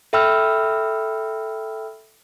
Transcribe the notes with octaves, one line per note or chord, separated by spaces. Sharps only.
A4 E5 G5 B5 E6 F6